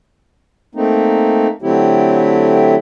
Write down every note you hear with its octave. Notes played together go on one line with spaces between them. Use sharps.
A3 A#3 C4 D#4
D3 F#3 A3 C4 E4 G4